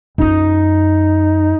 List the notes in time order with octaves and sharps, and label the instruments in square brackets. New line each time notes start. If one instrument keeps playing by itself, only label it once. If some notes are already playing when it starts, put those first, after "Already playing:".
[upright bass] F#2 F4 [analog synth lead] D#4